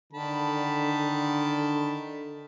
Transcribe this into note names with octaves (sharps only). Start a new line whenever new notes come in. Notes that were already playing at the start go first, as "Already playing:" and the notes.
D3 D#3 A5 B5